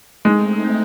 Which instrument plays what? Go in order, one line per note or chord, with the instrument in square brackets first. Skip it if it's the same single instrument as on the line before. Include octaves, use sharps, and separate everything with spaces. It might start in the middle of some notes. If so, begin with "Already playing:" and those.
[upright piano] G#3 [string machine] A3 C4 D#4